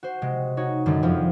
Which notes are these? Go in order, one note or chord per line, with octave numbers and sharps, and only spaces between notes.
F#4 C5
C3 G#3
D#4 F#4 C#5
F#2 D3 D#3 G3 G#3
F2 F3 F4